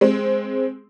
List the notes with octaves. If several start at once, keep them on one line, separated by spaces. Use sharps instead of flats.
G#3 C4